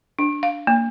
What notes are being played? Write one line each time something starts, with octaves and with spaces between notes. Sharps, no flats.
D4
F5
A#3